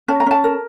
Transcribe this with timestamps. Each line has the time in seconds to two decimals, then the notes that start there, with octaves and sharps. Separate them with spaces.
0.08 C#4 A5
0.20 A#5
0.26 C#4 A5
0.44 A#4